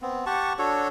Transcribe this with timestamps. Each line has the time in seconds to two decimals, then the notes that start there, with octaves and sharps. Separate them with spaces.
0.02 B3 C4
0.26 G4 F#5 A5 C#6
0.59 D4 F#4 A4 C#5